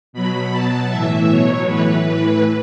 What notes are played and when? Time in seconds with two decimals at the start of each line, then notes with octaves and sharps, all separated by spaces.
0.13 B2 F#3 B5
0.52 B2 F#3 A5
0.90 A2 E3 E5
1.29 B2 F#3 C#5
1.67 A2 E3 B4
2.05 A2 E3 B4